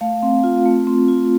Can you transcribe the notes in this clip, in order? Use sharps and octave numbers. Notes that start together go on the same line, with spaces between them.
A3 F5
C4
F4
A3
C4
F4